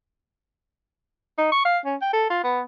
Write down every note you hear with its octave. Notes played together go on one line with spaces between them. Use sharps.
D#4
C#6
F5
C#4
G5
A4
F4
B3